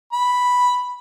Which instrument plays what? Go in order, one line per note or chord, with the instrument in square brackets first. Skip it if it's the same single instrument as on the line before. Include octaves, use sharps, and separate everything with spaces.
[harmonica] B5